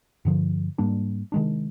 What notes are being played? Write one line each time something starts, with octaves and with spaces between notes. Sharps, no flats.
G2 D3 F3
G#2 G3 A#3 D4
C3 D#3 G#3 D4